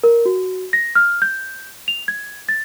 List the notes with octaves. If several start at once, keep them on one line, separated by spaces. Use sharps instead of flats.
A#4
F#4
A#6
F6
G6
F7
G#6
A6